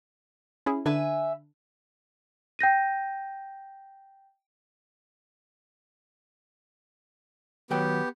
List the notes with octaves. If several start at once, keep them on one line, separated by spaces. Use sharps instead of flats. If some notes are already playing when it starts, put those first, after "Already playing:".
C#4 E4 G#4
D3 D4 B4 E5 G#5
G5 G6 A#6 D#7
D#3 F#3 B3 G4 G5